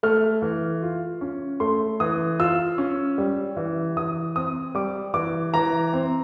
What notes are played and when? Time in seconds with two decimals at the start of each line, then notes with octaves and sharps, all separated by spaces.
0.03 A3 F6
0.42 E3
0.83 F4
1.21 C#4
1.60 A3 C6
2.00 E3 D#6
2.40 F4 E6
2.78 C#4
3.18 G3
3.57 E3
3.97 E3 D#6
4.36 C4 D#6
4.75 G3 D6
5.14 E3 D6
5.54 E3 A#5
5.93 C4